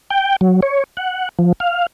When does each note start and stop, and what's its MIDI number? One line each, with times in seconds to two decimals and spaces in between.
0.10 0.36 79
0.41 0.60 54
0.62 0.84 73
0.97 1.29 78
1.39 1.53 53
1.60 1.87 77